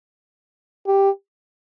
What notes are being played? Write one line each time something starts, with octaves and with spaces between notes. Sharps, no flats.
G4